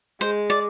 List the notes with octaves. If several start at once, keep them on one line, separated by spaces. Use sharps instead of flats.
G#3 C5
D5